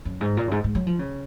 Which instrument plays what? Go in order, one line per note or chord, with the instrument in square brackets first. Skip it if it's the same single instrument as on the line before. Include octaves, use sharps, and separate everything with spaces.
[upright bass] F#2
G#2
A#2
F#2
G#2
G#2
F#3
F3
C#3